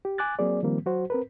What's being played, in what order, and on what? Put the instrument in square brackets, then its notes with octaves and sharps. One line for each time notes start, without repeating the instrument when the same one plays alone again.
[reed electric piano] G4
G#5 D6 F#6 A6
F#3 A#3 C4 G#4 D5
D#3 F3 G3 A#3 C4
F#3 F#4 C5
C4 A#4 B4